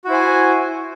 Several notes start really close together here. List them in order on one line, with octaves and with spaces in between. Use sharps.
F#4 E4 C5 G#5